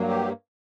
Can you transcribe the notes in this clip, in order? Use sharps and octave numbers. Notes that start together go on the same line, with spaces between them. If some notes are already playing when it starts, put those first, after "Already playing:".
Already playing: G2 F#3 A#3
G4